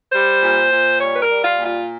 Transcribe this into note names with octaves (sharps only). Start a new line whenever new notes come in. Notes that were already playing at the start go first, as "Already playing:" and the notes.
G3 C5
A#2
A#2
G3 C#5
B4
A#4
G3
F4
A#2
F4